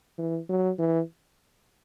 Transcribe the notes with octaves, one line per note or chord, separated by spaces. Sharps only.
E3
F#3
E3